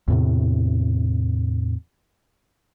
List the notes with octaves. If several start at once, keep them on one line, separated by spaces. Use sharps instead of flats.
E2 A2 C3